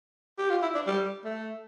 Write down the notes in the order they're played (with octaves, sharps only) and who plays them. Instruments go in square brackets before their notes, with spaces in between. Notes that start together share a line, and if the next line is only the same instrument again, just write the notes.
[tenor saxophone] G4
F4
E4
D4
G3
A3